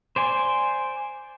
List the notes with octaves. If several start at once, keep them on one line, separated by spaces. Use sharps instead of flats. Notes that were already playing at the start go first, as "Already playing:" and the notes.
C5 D5 G#5